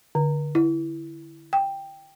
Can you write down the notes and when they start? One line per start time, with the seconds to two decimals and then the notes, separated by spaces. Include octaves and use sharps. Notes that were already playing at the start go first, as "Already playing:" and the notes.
0.15 D3
0.55 E4
1.53 G5